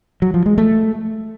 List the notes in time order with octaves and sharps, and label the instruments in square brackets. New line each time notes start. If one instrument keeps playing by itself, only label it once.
[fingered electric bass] F#3
F3
G#3
A3